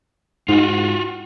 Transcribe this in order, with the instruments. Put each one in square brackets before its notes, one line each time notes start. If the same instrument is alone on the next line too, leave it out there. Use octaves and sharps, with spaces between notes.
[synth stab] G#2 [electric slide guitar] F4 F#4